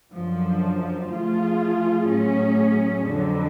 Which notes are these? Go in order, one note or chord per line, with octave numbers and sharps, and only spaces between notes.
F#2 D3 F3
F3 A3 F4 G#4
A2 F#3 C#4 G#4
F2 D3 F#3